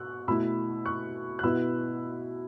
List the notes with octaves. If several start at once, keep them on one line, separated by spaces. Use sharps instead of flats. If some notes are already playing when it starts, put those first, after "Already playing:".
Already playing: B2 C#6 E6 F#6
B2 A3 E4 B5 E6
C#6 F#6
F#6
B2 B3 E4 B5 E6